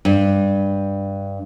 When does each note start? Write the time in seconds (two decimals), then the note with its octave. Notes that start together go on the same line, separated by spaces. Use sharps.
0.05 G2